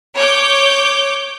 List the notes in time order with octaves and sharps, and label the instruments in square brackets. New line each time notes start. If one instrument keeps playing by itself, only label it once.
[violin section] C#5 D6 G6